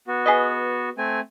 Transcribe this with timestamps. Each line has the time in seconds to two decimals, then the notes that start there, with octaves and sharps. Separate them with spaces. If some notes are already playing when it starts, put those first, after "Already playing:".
0.07 B3 F#4
0.26 G#4 B4 D#5
0.98 A3 C4 G#5